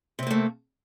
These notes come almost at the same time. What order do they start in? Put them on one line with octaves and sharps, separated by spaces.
C3 C4 A#3 A3